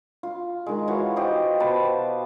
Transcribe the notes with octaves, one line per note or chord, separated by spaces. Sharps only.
F4
D#3 G#3
E3 F4 F#4 C#5
G4 C5 D#5
B2 B4 C5 A5